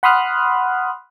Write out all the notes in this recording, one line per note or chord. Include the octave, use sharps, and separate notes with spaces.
F#5 B5 C6 D#6 F6 F#6